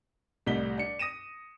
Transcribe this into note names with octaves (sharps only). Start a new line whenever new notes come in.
C2 A2 G3 D#5 B6 G7
D4 C#7
D#6 A#6 D#7 E7